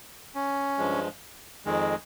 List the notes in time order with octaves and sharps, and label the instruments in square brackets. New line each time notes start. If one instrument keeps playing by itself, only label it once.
[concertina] C#4
[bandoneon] G2 F3 G#3
F2 D#3 G#3